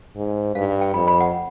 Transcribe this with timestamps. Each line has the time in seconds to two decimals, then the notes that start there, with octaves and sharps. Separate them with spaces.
0.16 G#2
0.55 G2 F5
0.81 G5
0.94 F2 B5
1.08 B5
1.20 F#5